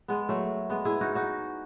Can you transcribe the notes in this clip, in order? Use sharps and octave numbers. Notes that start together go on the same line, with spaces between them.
G#3 B3
F#3 A3
G#3 B3
E4 G#4
D#4 F#4
D#4 F#4